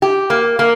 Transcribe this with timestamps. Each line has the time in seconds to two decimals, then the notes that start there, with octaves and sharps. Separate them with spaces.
0.02 G4
0.30 A#3
0.59 A#3